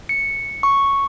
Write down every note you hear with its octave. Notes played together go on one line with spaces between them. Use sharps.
C#7
C#6